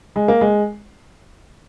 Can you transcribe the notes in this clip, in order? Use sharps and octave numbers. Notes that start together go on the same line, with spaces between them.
G#3
A#3
G#3